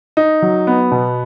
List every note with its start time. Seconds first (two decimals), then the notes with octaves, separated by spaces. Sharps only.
0.17 D#4
0.42 F#3
0.67 B3
0.91 B2